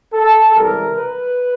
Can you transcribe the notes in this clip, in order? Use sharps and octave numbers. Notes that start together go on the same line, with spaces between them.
A4
C#2 C3 E3 G3 A#4
B4